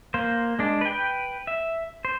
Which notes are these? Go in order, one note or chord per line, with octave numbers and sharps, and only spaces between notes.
A#3 C5
G#3 D4
B4 G5
E5
C5